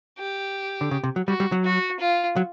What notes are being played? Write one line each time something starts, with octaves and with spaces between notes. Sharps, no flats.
G4
D3
C#3
C3
F#3
G3 F#4
G3
F#3
F#4
F4
F#3